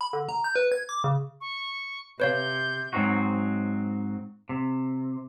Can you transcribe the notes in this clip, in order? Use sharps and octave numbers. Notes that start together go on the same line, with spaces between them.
B5
D3
A#5
G6
B4
G#6
D6
C#3
C#6
C3 B4 C#5 F5 G6
G#2 F#3 C4 D#4 F#4
C3